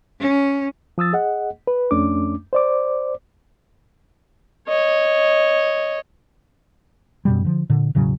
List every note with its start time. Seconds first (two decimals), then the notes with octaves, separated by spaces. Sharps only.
0.20 C#4
0.98 F3 D#6 E6 A6
1.13 G#4 D#5 F#5
1.67 B4
1.91 F2 A3 C#4 D4 D6
2.53 C5 D5 D6
4.68 C#5 D#5
7.25 F#2 B2 G3
7.45 D3 F3
7.70 A#2 D3
7.95 E1 A2 C#3 F#3